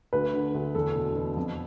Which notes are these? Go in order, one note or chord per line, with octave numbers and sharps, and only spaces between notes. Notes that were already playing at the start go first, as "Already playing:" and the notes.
D2 B4
D3
D2
E2 A4
B2
B2
F2